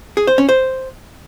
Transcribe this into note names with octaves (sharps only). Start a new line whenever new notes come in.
G#4
C5
C#4
C5